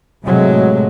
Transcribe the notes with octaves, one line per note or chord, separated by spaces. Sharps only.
A2 C3 F#3 G#3 A3